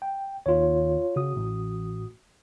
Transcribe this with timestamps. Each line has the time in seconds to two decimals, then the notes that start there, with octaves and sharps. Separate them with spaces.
0.02 G5
0.46 D#2 F4 C#5
1.16 C#3 F#4 D#6
1.36 A1